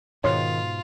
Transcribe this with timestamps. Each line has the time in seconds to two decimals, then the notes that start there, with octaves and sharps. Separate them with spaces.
0.24 G#2 B2 D#3 F4 C#5 C6 F6